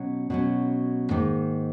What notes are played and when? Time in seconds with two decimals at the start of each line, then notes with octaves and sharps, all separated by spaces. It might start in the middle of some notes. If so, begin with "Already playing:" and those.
Already playing: B2 F#3 C#4
0.30 B2 F#3 C#4
1.10 G#2 D#3 A#3 D#4